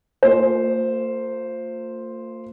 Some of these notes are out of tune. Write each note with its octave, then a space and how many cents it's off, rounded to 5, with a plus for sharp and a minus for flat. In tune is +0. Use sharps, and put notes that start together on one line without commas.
A#3 -45 F4 +15 C5 +0